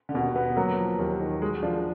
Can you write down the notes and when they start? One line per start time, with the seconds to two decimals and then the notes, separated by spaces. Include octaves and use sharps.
0.09 D3
0.14 D#2 B2
0.36 B3
0.57 F#3 A#3
0.79 F3
0.99 D#2
1.21 D#3
1.42 F#3 G#3
1.63 F3 D4